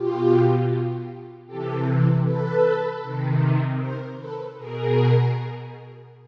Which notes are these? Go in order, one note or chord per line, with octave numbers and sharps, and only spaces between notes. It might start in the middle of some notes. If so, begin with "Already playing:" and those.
Already playing: B2 F4 G4
C3 E3 G4 A4
A4 B4
C3 D#3
A#4 C5
A4 B4
B2 G#4 A#4